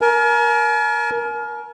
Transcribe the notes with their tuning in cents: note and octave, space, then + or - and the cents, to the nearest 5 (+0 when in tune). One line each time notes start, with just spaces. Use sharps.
A#4 +15 G#5 +45